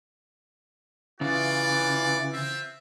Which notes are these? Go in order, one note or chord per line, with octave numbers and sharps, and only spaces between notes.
C#3 E3 F4 F#4 D5
C4 F4 E5